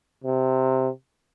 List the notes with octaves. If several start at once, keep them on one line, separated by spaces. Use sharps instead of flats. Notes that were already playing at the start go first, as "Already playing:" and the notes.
C3